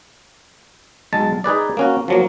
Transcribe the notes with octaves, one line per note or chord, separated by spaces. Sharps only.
B1 G#3 A5
D#4 G#4 B4 D5
A#3 C#4 F#4
F3 F#3 A#3